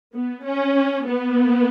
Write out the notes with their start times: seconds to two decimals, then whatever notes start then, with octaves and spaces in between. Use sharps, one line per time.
0.14 B3
0.45 C#4
1.07 B3